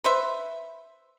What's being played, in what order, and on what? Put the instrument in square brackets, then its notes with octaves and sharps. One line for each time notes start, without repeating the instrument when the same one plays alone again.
[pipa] B4 C5 E5